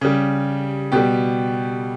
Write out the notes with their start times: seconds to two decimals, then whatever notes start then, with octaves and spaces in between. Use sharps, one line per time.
0.01 C#3 G3
0.92 B2 G3 G4